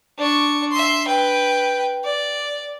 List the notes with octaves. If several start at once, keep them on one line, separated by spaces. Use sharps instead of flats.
D4 C#6
E5 C6
B4 G5
D5